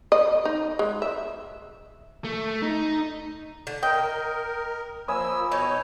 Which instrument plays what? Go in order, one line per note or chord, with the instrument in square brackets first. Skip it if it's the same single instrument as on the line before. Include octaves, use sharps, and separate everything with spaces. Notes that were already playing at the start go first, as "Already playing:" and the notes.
[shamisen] D#5
D#4
G#3
E5
[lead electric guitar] A3
D#4
[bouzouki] D3
[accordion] A#4 [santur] D#5 [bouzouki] G5
[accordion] F3 A#3 E6 [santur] G#5 B5 D#6
[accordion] B2 B3 C#5 [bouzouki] D#4